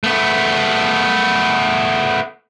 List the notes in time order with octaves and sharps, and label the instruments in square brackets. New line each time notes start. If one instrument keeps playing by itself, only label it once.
[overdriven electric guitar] A3 B3